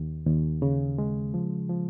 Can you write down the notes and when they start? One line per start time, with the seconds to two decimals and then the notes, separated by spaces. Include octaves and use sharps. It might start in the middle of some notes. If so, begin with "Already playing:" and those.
Already playing: D#2
0.27 D#2
0.62 C#3
0.98 G#3
1.34 F3
1.69 F3